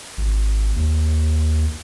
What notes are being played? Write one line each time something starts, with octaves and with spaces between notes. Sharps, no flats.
G#1
D#2